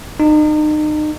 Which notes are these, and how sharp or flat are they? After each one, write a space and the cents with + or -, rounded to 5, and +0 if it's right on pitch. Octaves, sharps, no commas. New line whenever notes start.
D#4 -35